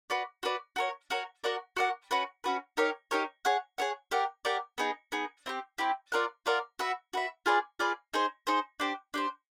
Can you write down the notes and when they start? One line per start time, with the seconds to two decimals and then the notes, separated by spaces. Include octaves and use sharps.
0.10 F#4 B4 D5
0.43 F#4 B4 D5
0.76 F#4 A#4 C#5
1.10 F#4 A#4 C#5
1.44 F#4 A#4 D5 F#5
1.77 F#4 A#4 D5 F#5
2.11 C#4 F#4 B4
2.44 C#4 F#4 B4
2.77 D#4 G4 A#4 C#5
3.11 D#4 G4 A#4 C#5
3.45 G#4 C#5 F#5
3.78 G#4 C#5 F#5
4.11 G4 A#4 D5 F#5
4.45 G4 A#4 D5 F#5
4.78 B3 D#4 G#4
5.12 B3 D#4 G#4
5.46 C4 E4 G4
5.78 C4 E4 G4
6.12 F4 A#4 D5 F#5
6.46 F4 A#4 D5 F#5
6.79 F#4 B4 E5
7.13 F#4 B4 E5
7.46 F4 G#4 B4 D5
7.79 F4 G#4 B4 D5
8.14 D#4 G#4 C5
8.47 D#4 G#4 C5
8.80 D4 G4 C5
9.14 D4 G4 C5